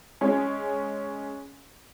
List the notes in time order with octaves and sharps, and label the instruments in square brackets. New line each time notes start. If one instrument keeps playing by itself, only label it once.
[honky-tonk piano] G#3 C#4